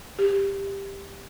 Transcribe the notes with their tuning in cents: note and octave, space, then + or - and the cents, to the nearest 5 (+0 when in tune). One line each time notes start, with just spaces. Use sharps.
G4 +10